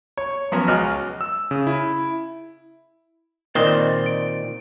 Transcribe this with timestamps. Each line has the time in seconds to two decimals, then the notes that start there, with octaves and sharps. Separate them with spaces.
0.17 C#5
0.52 F3 F#3 B3 C#4
0.68 C#2 F#4 D#5 F6
1.21 E6
1.51 C#3
1.67 E4
3.55 A#2 D#3 C4 D5 D#5 G7
4.06 D7